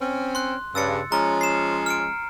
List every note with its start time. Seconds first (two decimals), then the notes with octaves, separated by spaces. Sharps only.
0.01 C4 C#4
0.35 C6 F#6
0.75 G2 C#3 E6 A6 C#7
1.12 F3 G#3 C#4 A#5
1.41 C7 E7
1.86 F6 C#7 D7